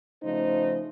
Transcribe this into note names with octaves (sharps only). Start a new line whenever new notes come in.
C#3 F3 A3 D#4 C5